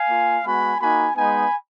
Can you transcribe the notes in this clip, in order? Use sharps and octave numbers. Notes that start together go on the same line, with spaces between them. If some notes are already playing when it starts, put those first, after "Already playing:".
Already playing: F5 G#5
A#3 F4
G#3 B3 F#4 G#5 B5
A#3 D#4 F#4 G#5 B5
G#3 B3 D#4 G#5 B5